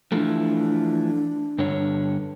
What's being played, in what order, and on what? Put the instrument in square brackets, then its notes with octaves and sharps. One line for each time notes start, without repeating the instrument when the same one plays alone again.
[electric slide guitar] E3 F3 A3 [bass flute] D4
[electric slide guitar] G2 D3 C#5